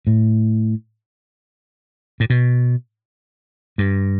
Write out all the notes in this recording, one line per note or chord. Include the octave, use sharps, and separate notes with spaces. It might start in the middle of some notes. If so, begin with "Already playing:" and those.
A2
A2
B2
G2